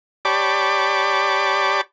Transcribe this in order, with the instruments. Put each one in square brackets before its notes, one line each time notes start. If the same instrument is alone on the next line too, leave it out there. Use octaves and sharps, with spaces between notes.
[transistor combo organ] G4 C#5 D5 A5 B5 D6